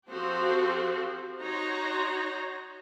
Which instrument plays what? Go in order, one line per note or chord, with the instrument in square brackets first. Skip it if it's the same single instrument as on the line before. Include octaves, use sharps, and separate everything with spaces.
[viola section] F3 C4 F#4 G4 A4 C5
D#4 F#4 C#5 A#5 C6